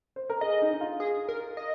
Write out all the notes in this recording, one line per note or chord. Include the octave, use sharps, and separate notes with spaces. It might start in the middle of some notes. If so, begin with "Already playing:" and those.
C5
A#4
G#4 D#5
D#4
D#4
F4
G#4
A#4
D#5